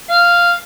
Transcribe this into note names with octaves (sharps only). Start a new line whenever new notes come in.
F5